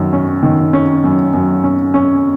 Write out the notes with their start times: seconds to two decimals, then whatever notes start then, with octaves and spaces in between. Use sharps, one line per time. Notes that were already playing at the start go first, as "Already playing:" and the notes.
Already playing: F#2 D#3
0.13 C#4
0.43 D#3
0.73 C#4
1.04 F#2
1.33 F#2
1.64 C#4
1.94 C#4